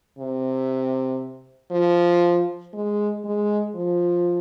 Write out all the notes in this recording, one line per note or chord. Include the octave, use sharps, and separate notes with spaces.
C3
F3
G#3
G#3
F3